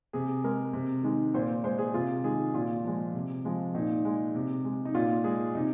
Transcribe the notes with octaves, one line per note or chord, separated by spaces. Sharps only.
C3 G#4
G#3 A#4
C3
D#3 G#3
A#2 C5
G#3 C5
G#4
C3 F4
D#3 G#3 G#4
A#2 F4
F3 G#3
C3
F3 G#3
A#2 D#4
G#3
C3
G#3
D#4
A#2 F4
G#3 G#4
C3 D#4